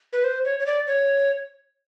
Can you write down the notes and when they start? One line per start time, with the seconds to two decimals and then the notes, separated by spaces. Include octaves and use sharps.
0.13 B4
0.24 C5
0.45 C#5
0.60 C#5
0.66 D5
0.87 C#5